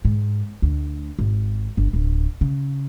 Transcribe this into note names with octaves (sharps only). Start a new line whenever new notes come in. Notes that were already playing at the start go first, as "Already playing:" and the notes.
G#2
D2
G#1
G1
D1
C#3